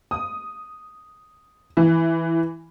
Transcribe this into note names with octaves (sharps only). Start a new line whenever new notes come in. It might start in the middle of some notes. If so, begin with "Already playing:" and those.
D#6
E3